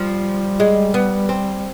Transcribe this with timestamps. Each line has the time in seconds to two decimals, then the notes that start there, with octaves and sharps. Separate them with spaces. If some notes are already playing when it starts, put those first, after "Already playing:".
Already playing: F3 G3
0.60 G#3
0.94 B3
1.29 C4